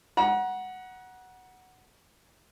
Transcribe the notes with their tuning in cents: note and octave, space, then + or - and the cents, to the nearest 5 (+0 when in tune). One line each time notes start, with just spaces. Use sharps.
F#5 +0 A#5 +40